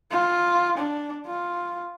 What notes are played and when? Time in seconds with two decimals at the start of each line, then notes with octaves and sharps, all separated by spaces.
0.11 F4
0.78 D4
1.27 F4